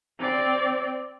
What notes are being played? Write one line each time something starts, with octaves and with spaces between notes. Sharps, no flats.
C4 D5